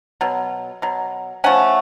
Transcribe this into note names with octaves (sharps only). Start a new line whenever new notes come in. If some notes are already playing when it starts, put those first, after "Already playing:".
B2 F#3
B2 F#3
F3 A3 C#4 F#5 G#5